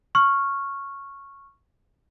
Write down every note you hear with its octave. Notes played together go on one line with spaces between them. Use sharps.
C#6 F6